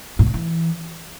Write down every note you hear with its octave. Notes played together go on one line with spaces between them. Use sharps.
A2
C3
E3